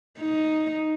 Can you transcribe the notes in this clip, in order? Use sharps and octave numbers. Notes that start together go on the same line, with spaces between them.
D#4